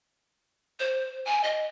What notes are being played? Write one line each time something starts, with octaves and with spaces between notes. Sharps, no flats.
C5
G#5
D#5